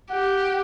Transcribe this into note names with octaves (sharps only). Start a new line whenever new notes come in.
G4 F#5